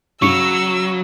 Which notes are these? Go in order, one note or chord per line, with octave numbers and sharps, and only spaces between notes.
C#3 F#3 C#6 E6 C#7